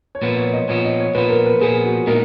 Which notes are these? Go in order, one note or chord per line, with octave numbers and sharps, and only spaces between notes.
C#5
A#2 F3 B3 B4
C#5
D#5
A#2 F3 B3 C#5
D#5
C#5
A#2 F3 B3 B4
A#4
B4
A#2 F3 B3 G#4
F#4
A#2 G#3 B3 D#4 A#4